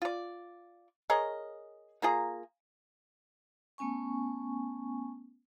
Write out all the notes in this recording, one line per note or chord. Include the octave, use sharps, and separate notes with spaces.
F4 D5
G#4 A#4 C#5 D#5
A#3 F4 G#4 A#5
A3 B3 C#4 G#5 C#6